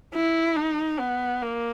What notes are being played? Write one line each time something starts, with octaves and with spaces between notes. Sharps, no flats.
E4
D#4
B3
A#3